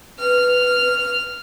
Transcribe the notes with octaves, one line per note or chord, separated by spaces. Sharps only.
B4 F6